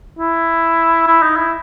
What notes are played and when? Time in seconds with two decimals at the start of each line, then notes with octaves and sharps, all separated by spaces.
0.19 E4
1.07 E4
1.23 D#4
1.36 E4